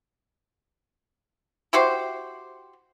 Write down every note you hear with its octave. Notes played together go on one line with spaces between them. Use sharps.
E4 F#4 G4 C5